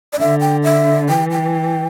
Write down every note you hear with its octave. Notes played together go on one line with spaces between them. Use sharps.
D5
D3 E5
G5
E5
E3 G5
G5